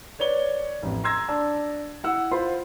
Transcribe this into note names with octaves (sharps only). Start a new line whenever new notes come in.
B4 C#5 D5 G7
A1 F2
A#5 C6 E6 G#6 A#6
D4 A5 E6
E4 F#5 E6
F4 C5 F#5 B5 C6